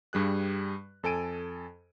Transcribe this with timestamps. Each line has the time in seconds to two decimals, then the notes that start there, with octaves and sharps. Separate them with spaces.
0.13 G2 G3 G#4 F#6
1.03 F2 A4 G#5 D7 D#7